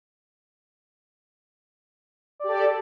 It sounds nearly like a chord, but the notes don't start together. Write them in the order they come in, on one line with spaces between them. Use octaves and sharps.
D5 G4 A4